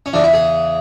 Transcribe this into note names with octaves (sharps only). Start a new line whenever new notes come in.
C#4
E2 C#3 E3 D4
E4
G#4